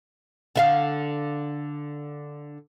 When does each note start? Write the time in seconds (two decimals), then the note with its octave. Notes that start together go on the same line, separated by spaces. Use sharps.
0.56 D3 E5 F5